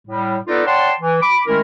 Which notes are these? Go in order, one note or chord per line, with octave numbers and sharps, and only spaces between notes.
A2 G3
B3 D#4 F4 A4 B4 D5
C#5 D5 F#5 G5 A5 C6
E3
B5 D6
D#3 G#3 A3 C#4 E4 A#4